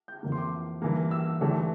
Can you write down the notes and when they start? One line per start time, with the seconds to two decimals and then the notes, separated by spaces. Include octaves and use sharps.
0.08 G6
0.23 F2 E3 A#3
0.32 C6
0.38 D6
0.82 G2 E3 A#3
1.11 E6
1.41 G1 G2 E3 A3 D4